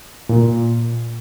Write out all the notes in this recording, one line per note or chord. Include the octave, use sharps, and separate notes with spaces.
A#2